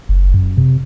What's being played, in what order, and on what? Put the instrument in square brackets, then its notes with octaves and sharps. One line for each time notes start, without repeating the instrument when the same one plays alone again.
[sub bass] F#1
F#2
C3